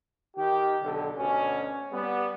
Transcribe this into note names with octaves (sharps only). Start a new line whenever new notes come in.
D#3 G4
B1 D3
D2 B2 C#4
G3 B3